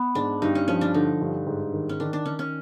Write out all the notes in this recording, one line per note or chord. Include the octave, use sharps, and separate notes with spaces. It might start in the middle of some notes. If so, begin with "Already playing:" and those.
Already playing: B3
G#2 D4
G2 D#4
C#4
F3 C#4
D4
D3 D#4
G2
G#2
D#3
C#4
D#3 D4
D4
D#3 C#4
C#4